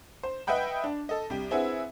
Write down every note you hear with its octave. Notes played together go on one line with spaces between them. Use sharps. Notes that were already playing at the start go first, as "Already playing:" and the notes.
C5
B4 D#5 E5 F#5 G5 B5
D4
A4 D#5
C2 G4
C4 E4 G#4 B4 E5 F#5